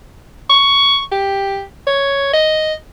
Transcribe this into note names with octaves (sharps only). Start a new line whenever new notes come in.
C#6
G4
C#5
D#5